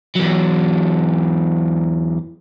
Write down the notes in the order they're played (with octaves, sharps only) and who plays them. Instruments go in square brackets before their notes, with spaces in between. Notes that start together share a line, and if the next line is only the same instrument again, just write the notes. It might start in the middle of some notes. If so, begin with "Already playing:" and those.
[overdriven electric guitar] E2 F#3